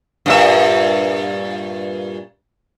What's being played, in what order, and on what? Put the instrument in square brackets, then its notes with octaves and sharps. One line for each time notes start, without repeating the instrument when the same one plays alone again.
[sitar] G2 A#2 E5